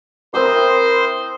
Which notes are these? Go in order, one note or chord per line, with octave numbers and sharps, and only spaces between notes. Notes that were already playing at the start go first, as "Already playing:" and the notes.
C4 E4 A#4 C5 D#6 E6